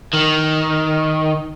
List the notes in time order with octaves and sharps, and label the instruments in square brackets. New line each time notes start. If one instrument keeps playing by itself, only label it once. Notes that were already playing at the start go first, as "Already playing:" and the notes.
[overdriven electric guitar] D#3